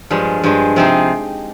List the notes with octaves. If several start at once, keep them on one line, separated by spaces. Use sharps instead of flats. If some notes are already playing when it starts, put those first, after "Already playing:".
G2 F3 G#3 D4
G2 F3 G#3 D4
C3 F3 C4 D#4 G#4